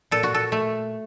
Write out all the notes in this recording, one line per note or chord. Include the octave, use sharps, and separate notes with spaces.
A#2 A4
F#4
A4
A3